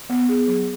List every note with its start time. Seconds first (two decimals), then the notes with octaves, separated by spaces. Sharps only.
0.09 B3
0.29 G#4
0.48 F#3